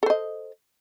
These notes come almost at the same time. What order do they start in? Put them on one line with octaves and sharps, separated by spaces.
A4 C5 D#5